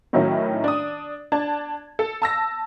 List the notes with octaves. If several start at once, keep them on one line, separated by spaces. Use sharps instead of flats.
A2 D#3 F#3 C#4 E4
D4 D#6
D4 A5 G#6
A4
A5 E6 A#6